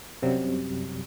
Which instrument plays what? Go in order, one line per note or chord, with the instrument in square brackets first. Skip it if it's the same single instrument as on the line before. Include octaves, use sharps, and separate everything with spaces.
[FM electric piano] F#2 C3 F#3 G3